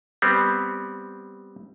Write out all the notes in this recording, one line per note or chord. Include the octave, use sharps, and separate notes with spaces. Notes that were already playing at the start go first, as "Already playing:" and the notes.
G3 B3 C4